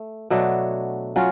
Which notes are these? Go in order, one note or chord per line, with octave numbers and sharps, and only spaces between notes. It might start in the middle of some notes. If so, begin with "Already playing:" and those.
Already playing: A3
B2 F#3 A3 D4
F#3 C#4 F4